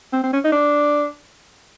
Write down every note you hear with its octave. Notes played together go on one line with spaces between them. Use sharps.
C4
C4
C#4
D#4
D4